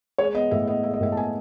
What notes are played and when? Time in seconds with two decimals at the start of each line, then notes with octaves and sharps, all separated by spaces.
0.18 G#3 C#5
0.34 B3 D#5
0.51 A2 E5
0.67 B3 D#5
0.83 G#3 E5
0.93 D#5
1.01 A2 E5
1.12 A5
1.17 B3 G#5